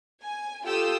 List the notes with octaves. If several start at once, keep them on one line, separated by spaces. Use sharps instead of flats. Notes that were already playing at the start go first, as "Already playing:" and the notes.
G#5
F4 G4 A4 G5 D#6 E6